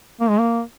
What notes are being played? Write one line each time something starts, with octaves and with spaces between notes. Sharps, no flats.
A#3
G#3
A#3